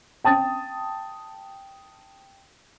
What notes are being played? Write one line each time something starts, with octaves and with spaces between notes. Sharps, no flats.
G5 A5 D#6 A6